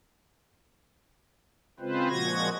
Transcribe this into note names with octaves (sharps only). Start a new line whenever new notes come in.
C#3 G#3 C4 F4 B4 C5
A#2 F3 G#3 F#4 G#6 A#6